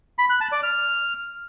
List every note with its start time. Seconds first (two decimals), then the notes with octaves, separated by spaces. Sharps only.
0.19 B5
0.30 F#6
0.41 A5
0.52 D5
0.63 F6